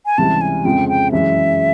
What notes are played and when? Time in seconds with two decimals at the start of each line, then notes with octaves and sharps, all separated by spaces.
0.06 G#5
0.18 C#2 C3 E3 G3 A5
0.41 G#5
0.65 F2 C#3 F3 G#3 G5
0.89 G5
1.12 F#2 C#3 E3 G#3 E5